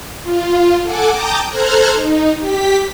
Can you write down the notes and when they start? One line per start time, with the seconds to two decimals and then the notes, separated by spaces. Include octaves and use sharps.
0.22 F4
0.82 A4 F#5 G#5 D6
1.11 G5 A5 A#5 D6 D#6 G6
1.47 A4 C5 A#5 F6 F#6 G#6
1.92 D#4
2.38 G4 B6